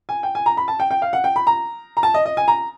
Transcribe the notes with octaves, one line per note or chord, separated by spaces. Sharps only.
G#5
G5
G#5
A#5
B5
A5
G5
G5
F5
F#5
G5
B5
A#5
A#5
A5
D#5
D#5
G#5
A#5